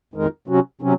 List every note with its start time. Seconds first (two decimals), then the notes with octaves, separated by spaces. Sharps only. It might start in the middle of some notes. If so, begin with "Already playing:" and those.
0.14 F2 D#3 G#3 D#4 A#4
0.48 C3 F#3 C#4 F#4
0.81 C3 F#3 C#4